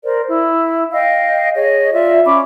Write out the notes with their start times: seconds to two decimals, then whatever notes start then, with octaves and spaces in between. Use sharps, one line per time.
0.03 A#4 C5 D5
0.28 E4
0.92 D#5 F5 G5
1.55 G#4 C#5 D#5
1.93 F4 D5 E5
2.25 C#4 B5 D6